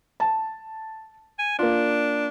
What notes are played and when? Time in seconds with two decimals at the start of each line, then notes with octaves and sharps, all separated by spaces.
0.20 A5
1.39 G#5
1.59 A#3 D4 F4